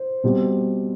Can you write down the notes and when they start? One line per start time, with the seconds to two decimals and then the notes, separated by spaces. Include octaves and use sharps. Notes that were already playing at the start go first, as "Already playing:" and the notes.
Already playing: C5
0.24 B2 G3 C4